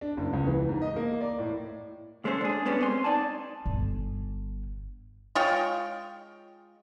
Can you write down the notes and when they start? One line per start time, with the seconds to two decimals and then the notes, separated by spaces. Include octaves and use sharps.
0.01 D4
0.17 F#1
0.33 C#2
0.47 E3
0.69 G#2
0.82 D#5
0.96 A#3
1.21 D5
1.39 A2
2.24 C2 G#3 A3 C#4 C5
2.41 D4 G#4
2.65 G#3 A3 B3 C#4 D4 G4
2.81 C4 G#5 C6
3.04 D#4 D5 G#5 A5
3.66 G1
5.35 G#3 F4 C#5 G5